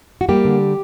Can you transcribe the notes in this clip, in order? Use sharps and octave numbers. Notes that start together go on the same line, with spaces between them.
F#4
G3 A#3 G4
D3